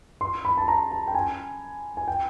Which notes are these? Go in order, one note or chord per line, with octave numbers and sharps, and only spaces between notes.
C6
B5
A5
A#5
A5
G5
G#5
G#5
G5